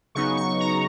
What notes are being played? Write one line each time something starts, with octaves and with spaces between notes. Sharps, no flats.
C#3 F#3 B3 D#4 C#6
C#6
A#5